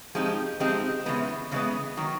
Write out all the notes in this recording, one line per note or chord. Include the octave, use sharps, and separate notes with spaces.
F3 G#3 C4 D#4 G4
F3 G#3 C4 D#4 G4
C#3 E3 G#3 B3
C#3 E3 G#3 B3
D#3 F#3